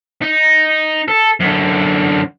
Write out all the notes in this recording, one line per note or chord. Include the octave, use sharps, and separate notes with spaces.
D#4
A4
F#2 D3